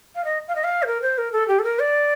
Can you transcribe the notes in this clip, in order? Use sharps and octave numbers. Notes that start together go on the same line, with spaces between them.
F5
D#5
F5
D#5
F5
C5
A#4
C5
A#4
A4
G4
A4
A#4
D5